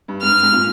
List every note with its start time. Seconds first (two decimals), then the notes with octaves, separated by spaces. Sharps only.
0.08 G2
0.22 G#2 F6
0.43 G#2
0.52 A#2